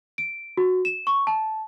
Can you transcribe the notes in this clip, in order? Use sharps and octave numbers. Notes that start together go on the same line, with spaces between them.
D7
F#4
E7
C#6
A5